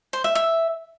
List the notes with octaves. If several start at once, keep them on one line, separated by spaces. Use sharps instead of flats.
C5
E5
E5